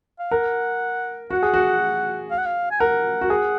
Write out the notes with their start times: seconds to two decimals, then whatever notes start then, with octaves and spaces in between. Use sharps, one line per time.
0.19 F5
0.31 A#4 F#5
1.31 F#4 F#5
1.43 G#4
1.54 F#4
2.31 F5
2.38 F#5
2.46 F5
2.71 G#5
2.80 A#4 F#5
3.21 F#4
3.30 G#4